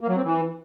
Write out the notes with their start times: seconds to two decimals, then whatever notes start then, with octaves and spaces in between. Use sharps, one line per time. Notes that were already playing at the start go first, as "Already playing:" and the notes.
0.01 A#3
0.09 F#3
0.17 C4
0.25 E3